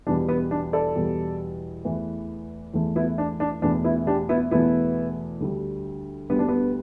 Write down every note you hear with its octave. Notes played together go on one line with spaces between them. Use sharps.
E2 B2 G3 D4
B3
D4
A4 D5
E2 B2 G3
E2 E3 A3
E2 E3 A3
B3 E4
D4
D4
E2 B2 A3 D4
B3 E4
D4 G4
B3 E4
E2 B2 A3 B3 E4
D2 D3 G3
D2 D3 G3 B3
D4
B3